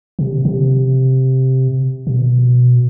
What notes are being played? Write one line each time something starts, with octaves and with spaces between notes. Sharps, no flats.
C3
C3
B2